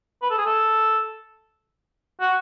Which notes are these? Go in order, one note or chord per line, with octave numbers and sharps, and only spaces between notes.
B4
A4
G#4
A4
F#4